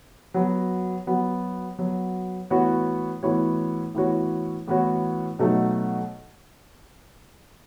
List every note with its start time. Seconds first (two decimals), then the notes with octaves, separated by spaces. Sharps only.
0.34 F#3 B3 F#4
1.07 F#3 B3 F#4
1.79 F#3 B3 F#4
2.50 A2 E3 B3 F#4 C#5
3.23 A2 E3 B3 F#4 C#5
3.95 A2 E3 B3 F#4 C#5
4.68 A2 E3 B3 F#4 C#5
5.39 B2 F#3 A3 D#4